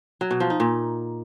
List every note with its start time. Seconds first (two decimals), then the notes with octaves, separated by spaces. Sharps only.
0.21 F#3
0.31 B2
0.40 F3
0.50 D#4
0.60 A#2